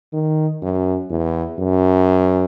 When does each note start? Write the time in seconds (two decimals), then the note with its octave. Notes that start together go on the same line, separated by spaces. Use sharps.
0.13 D#3
0.62 F#2
1.10 E2
1.59 F#2